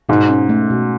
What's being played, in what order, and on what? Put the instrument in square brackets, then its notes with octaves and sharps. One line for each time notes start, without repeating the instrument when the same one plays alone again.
[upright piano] G#2 [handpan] B2
[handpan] C#4
A3
B2